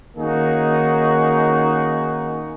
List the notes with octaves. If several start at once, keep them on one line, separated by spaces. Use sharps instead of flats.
D#3 A#3 C#4 D#4 F#4 G#4